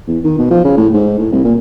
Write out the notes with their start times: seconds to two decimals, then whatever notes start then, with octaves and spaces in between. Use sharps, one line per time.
0.08 E2
0.24 D#3
0.38 B2
0.51 F3
0.64 C#3
0.77 A2
0.94 G#2
1.19 A2
1.32 C2
1.45 A#2